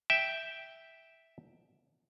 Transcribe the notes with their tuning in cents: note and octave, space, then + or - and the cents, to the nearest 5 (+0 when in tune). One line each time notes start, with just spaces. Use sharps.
E5 -5 G5 +0